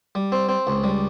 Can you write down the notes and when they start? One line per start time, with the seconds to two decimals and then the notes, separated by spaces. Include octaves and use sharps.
0.15 G3
0.32 C4
0.49 C4
0.67 C#2
0.84 G3